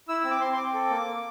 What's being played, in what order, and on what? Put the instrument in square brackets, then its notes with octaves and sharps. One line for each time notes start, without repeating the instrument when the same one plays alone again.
[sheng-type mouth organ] E4 E6
C4 E6
D6
C4 C6
C6
C4 D6
A4
A#3
A#3